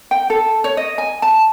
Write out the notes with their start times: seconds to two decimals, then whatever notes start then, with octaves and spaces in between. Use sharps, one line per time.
0.11 G5
0.30 A4
0.64 C#5
0.77 D#5
0.98 G#5
1.22 A5